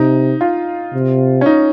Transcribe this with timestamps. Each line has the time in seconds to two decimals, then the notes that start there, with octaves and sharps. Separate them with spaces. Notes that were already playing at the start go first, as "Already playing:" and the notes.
Already playing: C3 D#4
0.41 F4
0.93 C3
1.41 C#4
1.46 D#4